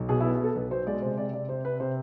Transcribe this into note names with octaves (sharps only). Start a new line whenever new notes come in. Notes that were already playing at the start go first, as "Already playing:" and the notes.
Already playing: B1
B2 G#4
E4
B3
G#4
B3 A4
B1 B4
B2 C5
G#3 D5
C3 C5
C3 D5
C3 D5
C3 C5
C3 B4
C3 C5